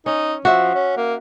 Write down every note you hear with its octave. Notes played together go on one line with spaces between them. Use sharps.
C#4 D#4
F3 F#4 E5
C#4
A#3